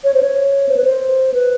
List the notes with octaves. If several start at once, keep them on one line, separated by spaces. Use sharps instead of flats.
C#5
C5
C#5
C5
B4
C5
B4